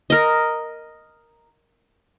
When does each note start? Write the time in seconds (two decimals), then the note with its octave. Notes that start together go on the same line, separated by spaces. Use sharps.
0.10 A#4 D#5